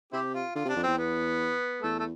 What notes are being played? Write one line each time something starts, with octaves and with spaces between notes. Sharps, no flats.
C3 C4 E4 G4
F4
D3 F4
C3
D4
F2
E2 C4
B3
E2 A3
A3